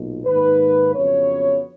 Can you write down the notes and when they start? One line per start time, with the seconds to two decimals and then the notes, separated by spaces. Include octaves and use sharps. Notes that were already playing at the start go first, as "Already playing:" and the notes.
Already playing: B1 A#2
0.25 G#2 D#3 A#3 B4
0.95 F2 C#3 F#3 B3 C#5